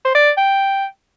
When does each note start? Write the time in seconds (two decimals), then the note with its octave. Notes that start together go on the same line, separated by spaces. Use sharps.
0.05 C5
0.15 D5
0.37 G5